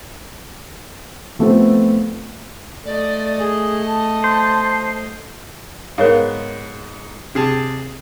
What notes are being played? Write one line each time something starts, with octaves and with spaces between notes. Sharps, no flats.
F3 A3 B3 C4 A4
A3 D5 D#5
G#4
A5
C5
G#2 B3 A#4 C#5 F5
C3 G#4 A5